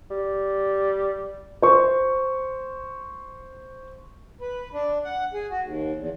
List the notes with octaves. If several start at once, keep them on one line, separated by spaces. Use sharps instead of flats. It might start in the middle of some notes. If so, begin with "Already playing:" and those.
G3
C5 C#6
B4
D4
F#5
G#4
F#4
D#2
E2